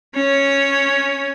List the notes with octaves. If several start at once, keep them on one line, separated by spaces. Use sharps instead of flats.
C#4 C#5